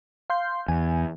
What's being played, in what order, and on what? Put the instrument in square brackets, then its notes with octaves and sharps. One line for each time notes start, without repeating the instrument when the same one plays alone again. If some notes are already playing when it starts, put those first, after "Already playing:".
[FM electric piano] F5 C6 G6
[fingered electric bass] E2 [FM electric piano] G#5